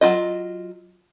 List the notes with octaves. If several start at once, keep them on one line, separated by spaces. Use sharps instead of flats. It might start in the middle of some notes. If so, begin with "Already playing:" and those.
F#3 F4 D#5